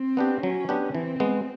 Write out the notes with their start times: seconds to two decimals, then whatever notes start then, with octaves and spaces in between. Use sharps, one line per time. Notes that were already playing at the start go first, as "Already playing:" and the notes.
Already playing: C4
0.17 B3 D4 G4
0.43 F#3 C#4
0.69 B3 D4 G4
0.95 E3 C4
1.20 G#3 B3